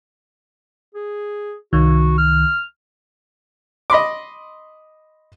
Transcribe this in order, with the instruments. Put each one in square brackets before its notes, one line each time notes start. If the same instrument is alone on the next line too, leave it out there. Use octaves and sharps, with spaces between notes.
[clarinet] G#4
[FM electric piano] C2 D#3 [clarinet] F#4
[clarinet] F6
[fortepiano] D#5 B5 C6 D6